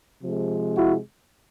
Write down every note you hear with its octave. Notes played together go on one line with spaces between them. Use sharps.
C3 F3 G#3
E4 F#4